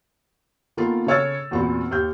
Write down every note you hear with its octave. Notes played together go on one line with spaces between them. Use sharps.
D#3 A#3 B3 F4 A4
C#3 A4 C#5 E6 F6 A6
E2 A#2 B3 C4 F#4
D#2 F6 G6